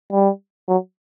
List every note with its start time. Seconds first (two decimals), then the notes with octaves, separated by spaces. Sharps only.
0.12 G3
0.68 F#3